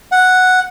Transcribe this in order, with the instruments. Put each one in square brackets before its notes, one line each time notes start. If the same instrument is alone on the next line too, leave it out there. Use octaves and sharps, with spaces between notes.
[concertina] F#5